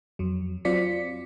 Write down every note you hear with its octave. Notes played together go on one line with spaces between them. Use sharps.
F2 F#3
F#3 C4 F4 D5 B6 C#7